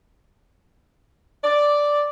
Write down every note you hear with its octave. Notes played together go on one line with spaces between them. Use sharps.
D5